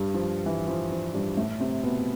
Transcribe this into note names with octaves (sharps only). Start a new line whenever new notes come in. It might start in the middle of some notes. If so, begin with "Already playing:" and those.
Already playing: G2 G3
F3
E3
F3
F3
G2 G3
A2 A3
C3 C4
B2 B3